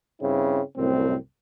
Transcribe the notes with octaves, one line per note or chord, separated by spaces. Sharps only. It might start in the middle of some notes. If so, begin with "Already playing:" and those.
G2 C#3 C4 E4
C2 F#2 A2 C4